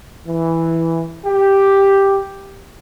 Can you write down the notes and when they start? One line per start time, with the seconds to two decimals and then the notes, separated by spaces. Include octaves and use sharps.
0.26 E3
1.26 G4